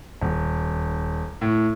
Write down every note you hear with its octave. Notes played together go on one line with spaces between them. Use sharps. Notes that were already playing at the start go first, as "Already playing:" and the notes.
D#1
A2